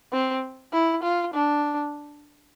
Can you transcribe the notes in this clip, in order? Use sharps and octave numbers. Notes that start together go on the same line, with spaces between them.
C4
E4
F4
D4